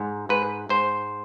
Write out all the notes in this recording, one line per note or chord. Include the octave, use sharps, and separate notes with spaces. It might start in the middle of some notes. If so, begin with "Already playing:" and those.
Already playing: G#2
G#2 B4
G#2 C5